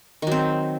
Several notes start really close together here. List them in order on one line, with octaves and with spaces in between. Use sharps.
D#3 F#3 C4